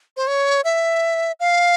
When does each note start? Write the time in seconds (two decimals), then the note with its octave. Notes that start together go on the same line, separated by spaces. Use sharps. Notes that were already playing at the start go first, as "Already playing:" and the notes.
0.16 C5
0.27 C#5
0.64 E5
1.40 F5